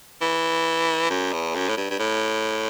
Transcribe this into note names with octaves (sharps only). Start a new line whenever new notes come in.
E3
F#2
E2
F#2
A2
G2
G2
A2